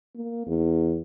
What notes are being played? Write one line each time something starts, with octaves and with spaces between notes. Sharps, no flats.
A#3
E2